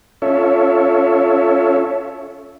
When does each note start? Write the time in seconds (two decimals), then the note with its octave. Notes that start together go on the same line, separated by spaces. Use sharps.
0.22 C#4 F4 A4 C#5 E5